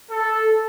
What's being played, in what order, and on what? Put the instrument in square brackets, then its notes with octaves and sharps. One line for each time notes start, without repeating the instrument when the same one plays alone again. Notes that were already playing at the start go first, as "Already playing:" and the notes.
[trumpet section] A4